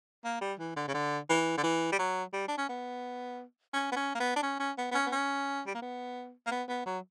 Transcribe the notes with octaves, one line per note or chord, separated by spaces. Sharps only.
A#3
G3
E3
D3
C#3
D3
E3
D3
E3
G3
F#3
G3
D4
C#4
B3
C#4
B3
C#4
A#3
B3
D4
C#4
C#4
B3
B3
C#4
B3
C#4
G3
A#3
B3
A#3
B3
B3
F#3